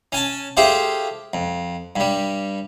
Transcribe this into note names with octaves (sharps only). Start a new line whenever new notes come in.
C#4 G#5 A5
A3 F4 G4 G#4 C5
F2
G2 G3